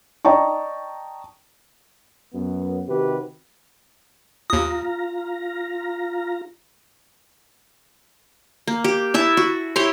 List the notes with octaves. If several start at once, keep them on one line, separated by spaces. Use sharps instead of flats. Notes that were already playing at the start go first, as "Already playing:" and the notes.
D5 D#5 G5 A5 A#5 C#6
F#2 B3
C3 D#3 F#4 G4 B4
D#2 F4 A#5 D#6
A#3
G4
E4 E5 A5
F#4
E4 G4 C#5 C6